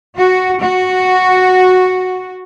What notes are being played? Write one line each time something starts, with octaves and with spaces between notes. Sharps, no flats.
F#4
F#4